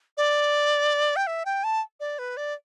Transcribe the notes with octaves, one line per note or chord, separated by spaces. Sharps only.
D5
G5
E5
G5
A5
D5
B4
D5